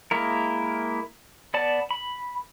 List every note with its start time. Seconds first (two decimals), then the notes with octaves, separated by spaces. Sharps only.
0.11 G#3 A#3 E4 A#4
1.54 B3 D5 A5
1.91 B5